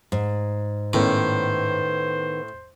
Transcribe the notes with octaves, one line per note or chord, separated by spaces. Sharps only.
G#2
A2 D#3 B3 C#4 C5